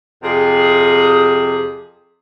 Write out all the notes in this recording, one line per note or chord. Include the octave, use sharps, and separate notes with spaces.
F2 C3 G4 G#4